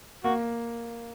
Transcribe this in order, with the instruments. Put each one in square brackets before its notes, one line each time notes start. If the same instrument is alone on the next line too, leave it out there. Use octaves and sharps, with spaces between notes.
[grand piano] A#3 [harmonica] F#4